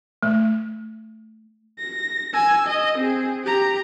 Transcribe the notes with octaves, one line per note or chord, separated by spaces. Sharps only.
A3
A#6
G#5 E6
D#5
C4 G#4
G4 A#5